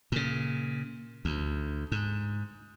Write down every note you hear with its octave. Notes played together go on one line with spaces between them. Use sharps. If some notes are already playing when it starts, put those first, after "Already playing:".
A#2 C#3
D2
G#2